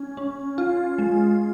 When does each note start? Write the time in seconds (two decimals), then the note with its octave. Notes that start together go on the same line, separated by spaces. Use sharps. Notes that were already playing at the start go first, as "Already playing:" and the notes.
Already playing: C#4
0.17 C#4
0.58 F4
0.98 G#3